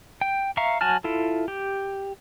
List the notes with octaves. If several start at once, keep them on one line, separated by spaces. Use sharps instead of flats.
G5
E5 F5 A#5 C#6
F#3 F#4 G#5 A5 F6
E4 F4 A4
G4